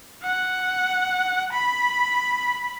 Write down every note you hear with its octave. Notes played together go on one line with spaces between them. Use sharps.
F#5
B5